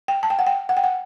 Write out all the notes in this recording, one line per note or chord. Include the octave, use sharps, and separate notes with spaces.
G5
A5
G5
F#5
G5
F#5
G5
F#5